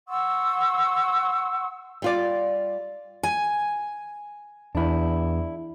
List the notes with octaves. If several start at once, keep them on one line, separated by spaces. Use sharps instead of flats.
F#5 C6 C#6 E6
G3 F4 D5
G#5
E2 D4 E4